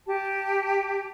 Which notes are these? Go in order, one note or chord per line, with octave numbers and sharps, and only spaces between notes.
G4 A5